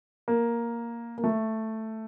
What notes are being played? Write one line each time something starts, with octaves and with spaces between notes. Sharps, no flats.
A#3
A#3
A3